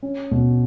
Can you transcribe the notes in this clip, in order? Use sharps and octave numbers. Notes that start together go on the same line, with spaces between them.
C#4
B2